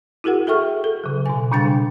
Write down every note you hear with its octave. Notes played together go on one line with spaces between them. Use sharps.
E4 F#4 G#4 A#4 F#5
G#4 A4 E5 G5 C#6 F6
A4
C#3 F#3
B2 G#5
A#2 C#3 G3 D4 G5 A6